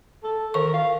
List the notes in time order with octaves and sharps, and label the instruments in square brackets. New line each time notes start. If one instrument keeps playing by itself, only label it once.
[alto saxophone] A4
[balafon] D#3 C#6 [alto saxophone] A#4
[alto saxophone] F5